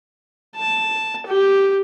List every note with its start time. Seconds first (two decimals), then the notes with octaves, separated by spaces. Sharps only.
0.56 A5
1.27 G4